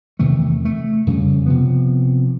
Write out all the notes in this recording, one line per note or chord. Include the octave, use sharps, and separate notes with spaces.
E2 C3 D#3 A3
A3
F2 C#3 G3
C3 F3 B3